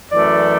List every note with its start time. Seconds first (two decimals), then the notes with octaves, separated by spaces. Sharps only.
0.11 F#2 E3 A3 D5